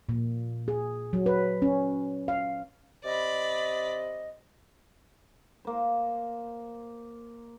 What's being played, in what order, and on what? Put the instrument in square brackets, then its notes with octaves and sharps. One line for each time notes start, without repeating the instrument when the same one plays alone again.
[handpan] A#2
G#4
F#3
B4
C#4
F5
[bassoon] C3 [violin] D5 B5 [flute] D#5
[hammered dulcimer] A#3 C5